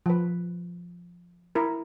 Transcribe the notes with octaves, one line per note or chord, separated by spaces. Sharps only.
F3 B4
E4 A#4